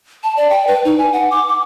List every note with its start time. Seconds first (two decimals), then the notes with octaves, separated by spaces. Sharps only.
0.23 A5
0.37 D5
0.50 G5
0.67 B4
0.85 D#4
0.98 G#5
1.13 F#5
1.31 D6
1.48 D6